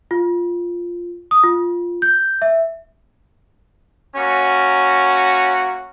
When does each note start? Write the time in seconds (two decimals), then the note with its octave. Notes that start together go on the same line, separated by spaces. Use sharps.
0.11 F4
1.31 D#6
1.43 F4
2.02 G6
2.42 E5
4.16 A#3 C#4 F#4